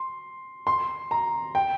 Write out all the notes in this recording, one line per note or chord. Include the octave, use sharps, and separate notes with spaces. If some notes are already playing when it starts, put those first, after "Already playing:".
Already playing: C6
C6
A#5
G5